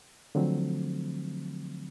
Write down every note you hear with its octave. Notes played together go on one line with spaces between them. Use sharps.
D3 F3 F#3 A3 C4